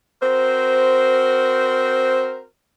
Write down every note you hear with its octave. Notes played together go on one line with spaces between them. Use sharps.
C4 F#4 A#4 C5